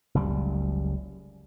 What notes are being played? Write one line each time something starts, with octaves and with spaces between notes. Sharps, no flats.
F#1 C#2 F#2 G3